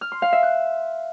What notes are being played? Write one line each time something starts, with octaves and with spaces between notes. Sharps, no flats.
F6
C6
F5
E5
F#6